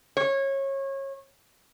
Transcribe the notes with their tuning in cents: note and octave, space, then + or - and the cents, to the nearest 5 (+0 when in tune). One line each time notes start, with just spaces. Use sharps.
C#5 -25